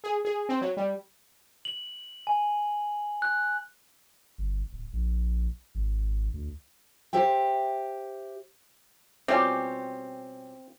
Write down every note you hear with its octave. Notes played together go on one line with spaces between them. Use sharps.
G#4
G#4
C4
F#3
G3
F#7
G#5
F#6
G1
D1
A#1
G#1
D2
G4 C5 E5 G5
B2 G3 C4 C#4 F4 G4 G#5